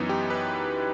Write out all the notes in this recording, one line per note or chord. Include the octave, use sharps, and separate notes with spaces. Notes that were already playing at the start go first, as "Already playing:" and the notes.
Already playing: F#2 E3 B3 D#4
G4
B4